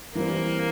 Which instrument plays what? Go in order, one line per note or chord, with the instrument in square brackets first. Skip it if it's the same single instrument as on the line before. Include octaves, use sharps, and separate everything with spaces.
[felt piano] E3 G3 C4 [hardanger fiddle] A#3